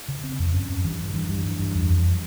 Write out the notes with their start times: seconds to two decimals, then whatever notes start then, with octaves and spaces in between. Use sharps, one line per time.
0.08 C#3
0.23 C#3 C4
0.39 F2
0.54 G2 C#4
0.70 G2
0.85 G2 E3
1.00 G2
1.14 G2 E3
1.29 G2
1.45 G2
1.59 G2
1.75 F2
1.90 F2